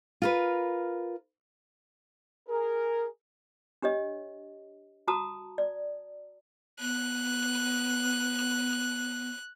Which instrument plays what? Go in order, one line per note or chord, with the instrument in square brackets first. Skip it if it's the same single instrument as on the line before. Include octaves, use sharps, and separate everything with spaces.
[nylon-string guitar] F4 A#4 B4
[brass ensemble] G#4 A#4
[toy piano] D4 G4 C#5 D#5
F#4 A5 A#5 D#6
D5
[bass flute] B3 [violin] F#6